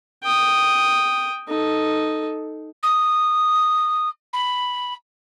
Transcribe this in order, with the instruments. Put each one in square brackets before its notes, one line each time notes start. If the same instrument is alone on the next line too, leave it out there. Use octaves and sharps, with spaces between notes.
[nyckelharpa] G5 D#6
D#4 A4
[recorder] D#6
B5